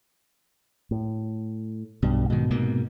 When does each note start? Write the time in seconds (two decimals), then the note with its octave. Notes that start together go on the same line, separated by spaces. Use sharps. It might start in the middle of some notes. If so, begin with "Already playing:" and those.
0.91 A2
2.02 B1 G2 B2
2.30 G#2 B2 D#3
2.51 G#2 C3 A#3